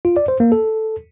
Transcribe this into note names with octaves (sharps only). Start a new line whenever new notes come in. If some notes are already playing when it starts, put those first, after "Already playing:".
F4
D5
C5
A#3
A4